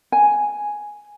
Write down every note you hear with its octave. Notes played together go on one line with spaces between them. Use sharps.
G#5